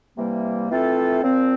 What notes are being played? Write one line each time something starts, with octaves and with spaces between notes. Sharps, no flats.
C3 E3 G3 A#3
E3 A3 C4 F4 A4
A#2 F3 C4